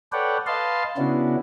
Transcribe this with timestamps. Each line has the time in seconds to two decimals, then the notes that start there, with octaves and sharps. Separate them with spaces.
0.12 A4 B4 C#5 D5 F#5 G5
0.47 B4 D#5 F5 A5 C6
0.97 C#3 B3 C#4 D4 E4 F#4